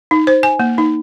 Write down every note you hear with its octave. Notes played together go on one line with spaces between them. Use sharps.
D#4
C5
G#5
A#3
D#4